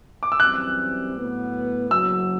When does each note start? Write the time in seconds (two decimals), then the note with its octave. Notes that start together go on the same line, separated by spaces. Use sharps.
0.23 D6
0.32 E6
0.40 F#2 E3 G3 C4 F#6
1.15 A2 F#3 B3
1.91 F#1 F#2 F#3 E6